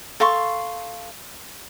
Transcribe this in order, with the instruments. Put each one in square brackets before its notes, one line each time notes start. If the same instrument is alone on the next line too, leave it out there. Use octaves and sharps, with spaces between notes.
[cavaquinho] A4 F5 C6 C#6